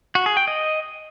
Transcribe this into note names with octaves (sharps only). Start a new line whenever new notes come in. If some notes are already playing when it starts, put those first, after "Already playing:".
F#4
G#4
G5
D#5